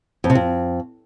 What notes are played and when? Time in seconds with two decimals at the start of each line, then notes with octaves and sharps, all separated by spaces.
0.24 F2
0.30 C3
0.35 F2